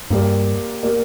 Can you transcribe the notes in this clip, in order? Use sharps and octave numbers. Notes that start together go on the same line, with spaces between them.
G2 A#3 G4 A#4 D5
A#3 G4 A#4 D5